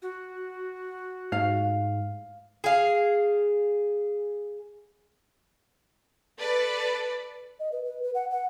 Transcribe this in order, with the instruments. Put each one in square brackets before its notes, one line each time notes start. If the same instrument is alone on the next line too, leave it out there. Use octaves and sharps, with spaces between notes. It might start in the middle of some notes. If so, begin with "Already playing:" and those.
[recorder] F#4
[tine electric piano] G#2 [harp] F5
[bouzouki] G#4 F5
[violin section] A4 B4 D5
[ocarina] D#5
B4
B4
B4
F#5
F#5